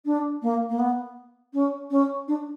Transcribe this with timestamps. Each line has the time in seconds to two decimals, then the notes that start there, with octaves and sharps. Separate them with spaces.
0.05 D4
0.42 A#3
0.69 A#3
0.78 B3
1.53 C#4
1.90 C#4
2.27 D4